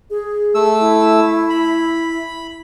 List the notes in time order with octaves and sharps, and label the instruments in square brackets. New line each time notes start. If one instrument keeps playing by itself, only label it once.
[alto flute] G#4
[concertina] A3 E6
[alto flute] E4
[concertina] B5